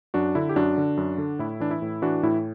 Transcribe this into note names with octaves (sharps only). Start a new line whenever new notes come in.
F#2 D4 F#4
D3 E4
G4
F#2 D4 F#4
D3
F#2
D3
A2 E4
E3 D4
E4
A2
E3 D4 F#4
A2 E4